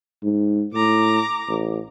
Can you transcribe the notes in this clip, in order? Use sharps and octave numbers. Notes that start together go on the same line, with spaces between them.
G#2
A2 A#5 D6
A1